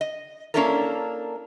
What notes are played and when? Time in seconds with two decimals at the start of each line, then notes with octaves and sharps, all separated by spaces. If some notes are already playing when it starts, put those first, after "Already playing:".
0.01 D#5
0.54 A#3 C#4 D4 E4 A4 A#4